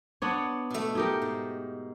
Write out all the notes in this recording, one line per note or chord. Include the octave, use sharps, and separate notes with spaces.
B3 D4 C#5
B2 A3
D#4 G4 A#4
G#2